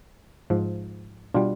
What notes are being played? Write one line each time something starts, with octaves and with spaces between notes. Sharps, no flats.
G#2 F3
B2 G3 D4 F4